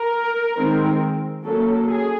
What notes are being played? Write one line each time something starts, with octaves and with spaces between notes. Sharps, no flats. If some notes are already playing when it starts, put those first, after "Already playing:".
Already playing: A#4
D#3 G#3 C4
F#3 A#3 C#4 A4
G#4